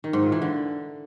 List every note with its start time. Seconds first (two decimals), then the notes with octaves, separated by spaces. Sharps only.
0.04 D#3
0.13 G#2
0.23 A#2
0.32 E3
0.42 D3